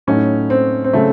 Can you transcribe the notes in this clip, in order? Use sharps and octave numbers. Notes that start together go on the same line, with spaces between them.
A2 F#3 A3 C#4 D#4
C4
C4
C#3 F#3 A3